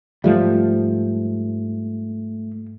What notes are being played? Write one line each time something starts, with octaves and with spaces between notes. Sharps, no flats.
G#2 F3 G3 A3